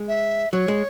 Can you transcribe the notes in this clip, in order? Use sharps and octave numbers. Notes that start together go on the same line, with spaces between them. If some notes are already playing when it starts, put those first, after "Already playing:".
Already playing: G#3
E5
F#3 C#5
G#3